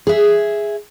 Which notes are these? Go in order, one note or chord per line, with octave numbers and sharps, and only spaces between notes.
G#4 E5